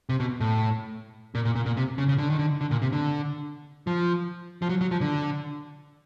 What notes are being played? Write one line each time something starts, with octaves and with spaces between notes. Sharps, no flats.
C3
B2
A2
A#2
A#2
A#2
A#2
C3
C#3
C#3
D3
D#3
D3
D3
A#2
C3
D3
F3
F3
F#3
F#3
F3
D3